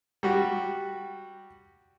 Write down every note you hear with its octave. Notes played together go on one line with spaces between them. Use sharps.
G3 F#4